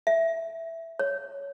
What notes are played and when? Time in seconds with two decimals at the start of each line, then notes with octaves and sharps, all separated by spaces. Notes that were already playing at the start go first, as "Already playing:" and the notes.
0.07 E5
0.99 C#5